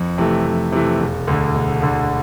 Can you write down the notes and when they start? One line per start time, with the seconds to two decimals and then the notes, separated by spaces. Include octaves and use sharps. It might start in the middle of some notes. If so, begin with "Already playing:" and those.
Already playing: F2
0.18 C3 E3 A3
0.45 F2
0.72 C3 E3 A3
1.00 E1
1.27 D2 D3
1.56 E1
1.82 D2 D3